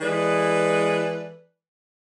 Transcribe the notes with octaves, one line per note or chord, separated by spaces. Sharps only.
E3 G#3 A4 B4 D5